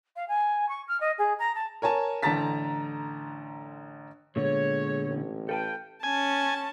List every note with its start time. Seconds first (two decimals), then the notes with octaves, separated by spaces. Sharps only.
0.16 F5
0.28 G#5
0.68 C#6
0.87 F6
1.00 D#5
1.18 G#4
1.38 A#5
1.55 A5
1.82 A#4 C#5 G#5 A5
2.22 A1 D3 A5 A#5 A6 B6
4.36 A#2 D3 G#3 B3 C#5
5.09 A1
5.49 A4 B4 F5 G5 A5
6.03 C#4 G#5 A5